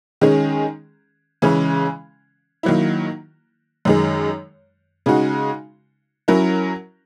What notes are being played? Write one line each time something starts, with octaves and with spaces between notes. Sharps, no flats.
D#3 G#3 C#4 G#4
C#3 E3 G#3 C#4
D#3 F#3 A#3 E4
F#2 D#3 G#3
C#3 G#3 D#4 F#4
F#3 C#4 E4 A#4